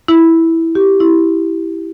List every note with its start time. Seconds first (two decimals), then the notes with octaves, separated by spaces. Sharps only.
0.08 E4
0.75 G4
1.00 E4